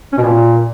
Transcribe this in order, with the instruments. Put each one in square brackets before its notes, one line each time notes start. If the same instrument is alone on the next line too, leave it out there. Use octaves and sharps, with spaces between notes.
[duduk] C#4
B2
A#2